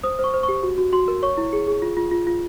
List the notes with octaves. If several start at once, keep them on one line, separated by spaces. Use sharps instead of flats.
C5 D#6
C5 C#6
C5
C#6
G4
F#4
F#4
F#4 C6
A#4
C#5 C#6
E4
G#4
G#4
F4
F4
F4
F4